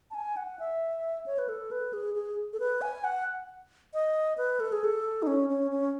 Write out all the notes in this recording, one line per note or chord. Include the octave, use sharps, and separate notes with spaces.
A5
G#5
F#5
E5
C#5
B4
A4
B4
G#4
G#4
A4
B4
G#5
F#5
D#5
B4
A4
G#4
A4
D#4
C#4
C#4
C#4